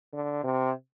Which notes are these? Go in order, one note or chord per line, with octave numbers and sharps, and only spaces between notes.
D3
C3